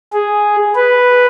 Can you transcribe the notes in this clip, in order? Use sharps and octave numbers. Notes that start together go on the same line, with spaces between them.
G#4
B4